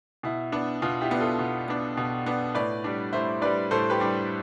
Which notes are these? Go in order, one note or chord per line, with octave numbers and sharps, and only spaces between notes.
B2 E4
B3 D4
B2 F4
E4 G4
B3 D4
F4 A4
B2
B3 D4
B2
B3 D4
A2 B4 D5
G3 D4
A2 C5 E5
G3 D4 B4 D5
A2 A4 C5
G4 B4
G3 D4